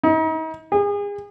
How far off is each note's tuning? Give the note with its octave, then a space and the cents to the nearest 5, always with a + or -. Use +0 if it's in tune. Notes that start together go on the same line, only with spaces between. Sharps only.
D#4 +40
G#4 -35